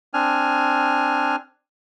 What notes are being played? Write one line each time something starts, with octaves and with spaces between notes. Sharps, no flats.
C4 D4 G#5 F6